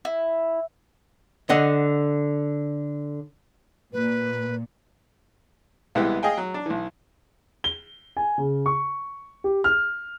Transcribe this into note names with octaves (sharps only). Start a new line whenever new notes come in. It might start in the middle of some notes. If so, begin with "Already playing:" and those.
E4
D3 D#5 F#5
A#2 B4
C2 E3 G#3 B3 E4 G4
G#4 D#5 F5 G5 G#5
F#3
D4
B1 E3
G7
G#5
C#3
C#6
G4
F6